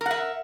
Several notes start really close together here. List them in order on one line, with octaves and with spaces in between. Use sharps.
A#4 F#5 E5